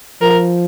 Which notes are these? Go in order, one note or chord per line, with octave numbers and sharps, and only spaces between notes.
F3 A#4